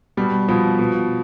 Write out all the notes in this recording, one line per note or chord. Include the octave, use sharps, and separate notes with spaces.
B2 G3
B2 F3
B2